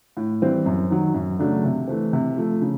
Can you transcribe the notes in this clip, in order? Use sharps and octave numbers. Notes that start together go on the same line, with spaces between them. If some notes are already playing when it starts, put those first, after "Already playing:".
A2
E3 G3 C4
F#2
D#3 F#3
F#2
C#3 F#3 A3 D4
C3
E3 A3 C4
C3
F3 A3
C#3